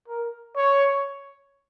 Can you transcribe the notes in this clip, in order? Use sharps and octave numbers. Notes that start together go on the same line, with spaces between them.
A#4
C#5